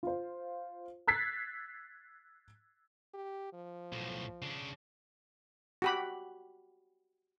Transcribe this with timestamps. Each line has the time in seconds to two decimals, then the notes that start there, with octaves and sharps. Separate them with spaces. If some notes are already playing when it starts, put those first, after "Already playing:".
0.03 F4 C5
1.07 E6 F#6 G#6 A6 B6 C7
3.14 G4
3.53 F3
3.92 B1 A2
4.42 C#3 D4
5.82 F#4 G4 B5